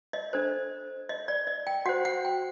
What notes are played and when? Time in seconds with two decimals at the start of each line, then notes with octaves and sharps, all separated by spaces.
0.13 D#5
0.33 D4 A4 C5
1.09 D#5
1.28 D5
1.47 D#5
1.67 G5
1.86 F#4 C5 F#5
2.05 F#5
2.25 G5